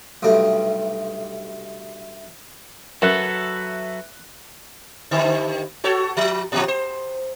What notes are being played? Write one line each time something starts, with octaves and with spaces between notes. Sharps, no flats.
B1 G2 C3 G3 A3
F#2 F#3 F#4 A4 B4 E5 F#6
G2 D3 D#3
F#4 A4 C#5
F3
A#2 D#3 F3
C5